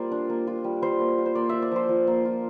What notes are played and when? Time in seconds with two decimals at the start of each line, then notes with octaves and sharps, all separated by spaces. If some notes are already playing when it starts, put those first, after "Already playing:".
Already playing: G3 A#3 F4 C5 D5
0.12 D4
0.30 A#3
0.47 F4
0.64 G3
0.82 G3 C5
1.00 A#3
1.18 F4
1.26 C5
1.35 A#3 D5
1.49 F4 E5
1.62 D5
1.72 F3 C5
1.89 F3
2.07 A#3
2.25 F4